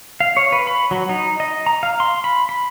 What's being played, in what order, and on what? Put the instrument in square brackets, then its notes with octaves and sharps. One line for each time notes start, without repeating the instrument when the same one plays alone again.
[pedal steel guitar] F5
C#5
B4
B5
F#3
D#4
D#5
A#5
F5
C6
B5
B5